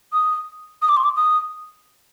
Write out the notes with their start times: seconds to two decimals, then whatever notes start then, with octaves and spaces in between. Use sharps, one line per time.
0.13 D#6
0.82 D#6
0.89 D6
0.97 C6
1.04 D6
1.16 D#6